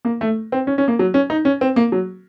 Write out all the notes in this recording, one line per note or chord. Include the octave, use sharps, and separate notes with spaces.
A#3
A3
C4
C#4
C#4
A#3
F#3
C#4
D#4
C#4
C4
A#3
F#3